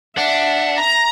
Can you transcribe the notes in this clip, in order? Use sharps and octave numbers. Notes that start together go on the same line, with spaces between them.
D4 E5 F#5
A#5